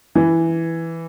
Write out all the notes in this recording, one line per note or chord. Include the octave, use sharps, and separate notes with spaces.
E3